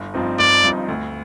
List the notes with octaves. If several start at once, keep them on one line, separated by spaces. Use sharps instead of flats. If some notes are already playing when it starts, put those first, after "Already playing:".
Already playing: G1
G2 F3 C4 D#4
G1 D5
G2 F3 C4 D#4
D2